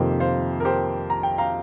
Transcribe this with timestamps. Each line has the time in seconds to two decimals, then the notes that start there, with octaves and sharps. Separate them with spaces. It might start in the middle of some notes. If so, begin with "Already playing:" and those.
Already playing: F2 C3 D#3 A#3 D#4 G4 C5
0.20 C5 F5
0.60 A#4
0.65 G4 C5
1.10 A#5
1.23 G5
1.38 F5 A#5